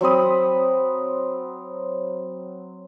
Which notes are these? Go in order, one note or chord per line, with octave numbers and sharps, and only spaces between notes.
F#3 C4 B5 D#6